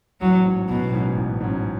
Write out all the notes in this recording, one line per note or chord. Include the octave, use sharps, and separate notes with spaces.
A1 F#3
G#2 F#3 C#4
A1 B2
G#2 F#3 C#4
A1
G#2 F#3 C#4